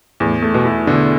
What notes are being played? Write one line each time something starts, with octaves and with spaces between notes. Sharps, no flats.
E2 A2
A3
B2
E4
B2 D3